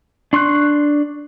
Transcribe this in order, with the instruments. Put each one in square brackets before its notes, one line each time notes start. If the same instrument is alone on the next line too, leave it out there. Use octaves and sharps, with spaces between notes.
[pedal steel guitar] D4 C6 C#6 F#6